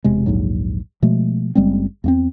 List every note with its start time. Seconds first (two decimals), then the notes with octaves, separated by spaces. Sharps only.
0.04 E1 C3 G#3
0.26 A#1 D#2 G#2 F#3
1.02 B2 F3 G#3 A3
1.55 F#1 G3 G#3 C4
2.04 E2 A#3 C4